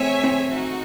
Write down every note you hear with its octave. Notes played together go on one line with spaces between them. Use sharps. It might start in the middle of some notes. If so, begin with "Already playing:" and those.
Already playing: A3 C4 G#4 C#5 E5 G#5
C4
D#4 F#4